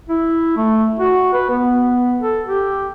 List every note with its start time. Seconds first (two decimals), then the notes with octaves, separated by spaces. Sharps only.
0.09 E4
0.57 A3
1.00 F#4
1.33 B4
1.50 B3
2.20 A4
2.46 G4